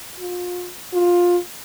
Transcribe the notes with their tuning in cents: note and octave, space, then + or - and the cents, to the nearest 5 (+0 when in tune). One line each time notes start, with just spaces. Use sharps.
F4 +35
F4 +15